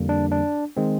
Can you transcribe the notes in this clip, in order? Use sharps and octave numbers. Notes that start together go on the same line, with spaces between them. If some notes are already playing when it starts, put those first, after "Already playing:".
Already playing: F2 D3 G3 A#3
D4
D4
D#3 G#3 C4